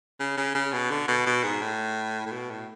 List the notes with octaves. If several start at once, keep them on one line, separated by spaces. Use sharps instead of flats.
C#3
C#3
C#3
B2
D3
B2
B2
G#2
A2
A2
B2
A2